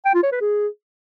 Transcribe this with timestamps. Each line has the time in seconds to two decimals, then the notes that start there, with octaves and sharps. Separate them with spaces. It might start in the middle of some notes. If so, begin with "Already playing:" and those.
0.05 G5
0.14 F4
0.23 C#5
0.32 B4
0.41 G#4